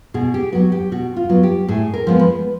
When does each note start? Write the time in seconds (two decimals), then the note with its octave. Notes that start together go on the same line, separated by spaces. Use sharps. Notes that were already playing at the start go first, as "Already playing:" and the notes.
0.14 B2 G#4
0.34 G4
0.52 F#3 B3 F#4
0.72 G4
0.92 B2 F#4
1.16 F4
1.29 F#3 B3
1.43 G4
1.68 A2 G#4
1.94 A#4
2.07 F3 G#3 B3
2.19 B4